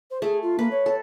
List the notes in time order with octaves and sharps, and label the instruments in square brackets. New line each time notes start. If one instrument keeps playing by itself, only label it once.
[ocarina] C5
[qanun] A3 [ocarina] G#4
[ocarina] F4
[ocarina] A#3 [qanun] B4
[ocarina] C#5
[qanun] A4